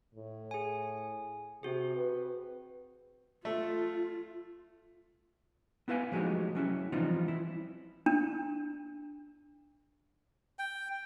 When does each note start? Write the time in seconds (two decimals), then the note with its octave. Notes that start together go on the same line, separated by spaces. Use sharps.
0.15 A2
0.51 G#4 G#5
1.63 C3 C4 F#4 G#4
1.96 B4
3.45 A3 F4
5.88 B3 E4 B4 F5 G#5
6.12 F3 F#3 G#3 A3 D#4 G4
6.55 F#3 C#4 E4
6.92 E3 F3 G3 C4 D#4 F4
7.28 E4
8.06 D4
10.59 G5